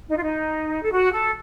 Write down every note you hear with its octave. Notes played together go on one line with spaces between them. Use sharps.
D#4
F4
D#4
A4
F#4
A4